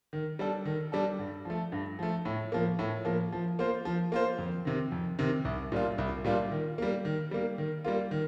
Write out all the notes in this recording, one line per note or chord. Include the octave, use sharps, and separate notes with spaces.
D#3
G3 D4 A4
D#3
G3 D4 A4
G2
F3 A3
G2
F3 A3
A2
F3 A#3
A2
F3 A#3
F3
A#3 F4 C5
F3
A#3 F4 C5
F2
C3 D#3
F2
C3 D#3
C2
A#2 G3 D4 F4
C2
A#2 G3 D4 F4
D#3
G3 A#3
D#3
G3 A#3
D#3
G3 A#3 F4
D#3